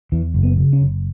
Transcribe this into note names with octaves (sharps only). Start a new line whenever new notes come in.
E2 E3
F#1
B3
C#3
C#4
F#1